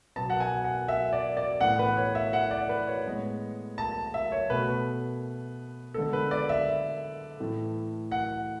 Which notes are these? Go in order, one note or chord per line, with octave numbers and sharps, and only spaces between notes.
B2 F#3 B3 A5
F#5
G#5
F#5
E5
D5
D5
A2 E3 B3 F#5
B4
C#5
E5
F#5
D5
B4
C#5
A2 G#3 B3
A5
E5
C#5
B2 A3 B4
D3 G#3 B3 A4
B4
D5
E5
A2 E3 A3
F#5